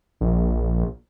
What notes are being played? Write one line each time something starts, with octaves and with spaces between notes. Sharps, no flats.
A#1